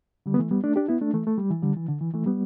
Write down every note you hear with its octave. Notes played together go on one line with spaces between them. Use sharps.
D3 G3
B3
E3 A3
G3 B3
A3 D4
D4 G4
B3 E4
A3 D4
E3 A3
A3
G3
E3
D3 G3
E3
D3
E3
E3 A3
G3 B3